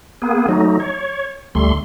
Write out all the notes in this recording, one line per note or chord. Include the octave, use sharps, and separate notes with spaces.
A#3 B3 G#4
F#3 A3 D#4
C#5
D2 G3 A3 C6